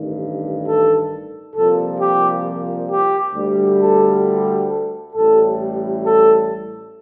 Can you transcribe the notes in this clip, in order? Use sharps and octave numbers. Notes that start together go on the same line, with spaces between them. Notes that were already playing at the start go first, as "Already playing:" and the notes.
Already playing: A1 G2 D#3
A4
C2 A#2 F3 A4
G4
G4
D2 D3 G3
A4
A4
A1 A2 G3 A4
A4